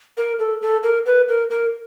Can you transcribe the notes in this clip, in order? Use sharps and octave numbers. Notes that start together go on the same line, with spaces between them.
A#4
A4
A4
A#4
B4
A#4
A#4